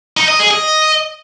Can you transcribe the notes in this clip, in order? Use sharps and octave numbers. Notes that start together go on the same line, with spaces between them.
D#4
D#5
G#4
D#5